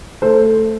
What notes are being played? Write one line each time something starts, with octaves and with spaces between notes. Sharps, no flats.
A3 A4 C5